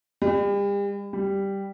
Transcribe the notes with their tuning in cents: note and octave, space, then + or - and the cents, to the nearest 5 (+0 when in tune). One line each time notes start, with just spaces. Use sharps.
G3 +40
G3 +0